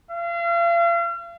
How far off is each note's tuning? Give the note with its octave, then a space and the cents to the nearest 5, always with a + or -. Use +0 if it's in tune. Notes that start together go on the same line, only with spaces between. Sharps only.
F5 -40